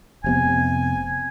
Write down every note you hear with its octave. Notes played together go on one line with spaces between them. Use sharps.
F1 C3 B3 G#5